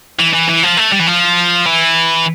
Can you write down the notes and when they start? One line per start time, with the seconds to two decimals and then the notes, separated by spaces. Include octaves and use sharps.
0.19 E3
0.34 E3
0.49 E3
0.63 F3
0.78 A3
0.93 G3
1.00 E3
1.07 F3
1.66 E3